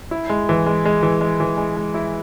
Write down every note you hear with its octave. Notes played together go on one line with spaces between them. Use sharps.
E4
G#3
E3
G#3
G#3
E3
G#3
E3
G#3
G#3
E4